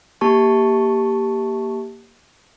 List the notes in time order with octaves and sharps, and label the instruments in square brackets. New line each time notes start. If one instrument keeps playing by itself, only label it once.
[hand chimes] A#3 G4 A5 C#6